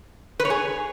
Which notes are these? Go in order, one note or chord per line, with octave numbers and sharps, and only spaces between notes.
B4
C#5
G#4